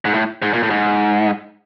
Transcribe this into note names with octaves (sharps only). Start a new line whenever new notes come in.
G#2
A2
G#2
A#2
A2
G#2